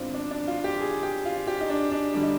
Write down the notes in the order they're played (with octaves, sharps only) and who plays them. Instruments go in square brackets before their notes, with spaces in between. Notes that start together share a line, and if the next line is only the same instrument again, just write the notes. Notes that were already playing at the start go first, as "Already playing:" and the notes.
Already playing: [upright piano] G#2 D#3 B3 C4 D4 F4
D4
D4
F4
G4
G#4
G4
F4
G4
D#4
D4
D4
D3 G3 D4
D#4